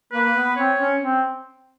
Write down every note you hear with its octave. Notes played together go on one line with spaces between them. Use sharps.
A#3 B4
B3
C4 C#5
C#4
C4